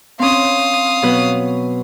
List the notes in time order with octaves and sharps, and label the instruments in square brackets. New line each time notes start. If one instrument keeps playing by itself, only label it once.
[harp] C4 C#4 [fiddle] F5 D#6
[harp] B2 F#3 B4